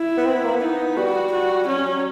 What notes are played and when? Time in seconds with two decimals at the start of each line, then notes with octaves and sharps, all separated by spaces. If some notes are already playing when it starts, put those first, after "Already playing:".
Already playing: E4
0.17 B3
0.26 C4
0.35 B3
0.44 A#3
0.53 B3
0.62 D#4
0.97 G3 F#4
1.32 F#4
1.68 F#3 C#4
1.86 F#3